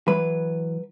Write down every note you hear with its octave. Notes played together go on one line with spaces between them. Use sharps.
E3 F#3 B4